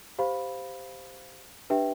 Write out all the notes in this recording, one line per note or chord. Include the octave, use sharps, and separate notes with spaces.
G4 C5 F5 B5
D4 G4 B4 E5 G5